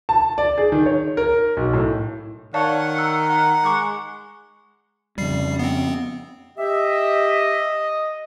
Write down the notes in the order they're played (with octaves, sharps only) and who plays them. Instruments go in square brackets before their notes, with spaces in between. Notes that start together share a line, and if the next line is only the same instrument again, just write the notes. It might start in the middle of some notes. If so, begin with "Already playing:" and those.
[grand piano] A5
D5
G#4
D#3
C#5
A#4
B1
A2
[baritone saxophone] D#3 [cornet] C#5 [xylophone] D5 F5 A5 [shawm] F#5
[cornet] A#5 [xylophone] E6
[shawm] F#5
[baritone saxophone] G#3 [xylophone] C#6 D6 F#6
[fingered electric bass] F2 C#3 [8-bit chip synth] G3 C7
[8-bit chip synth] B3 C4
[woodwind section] G4 E5 [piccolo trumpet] D#5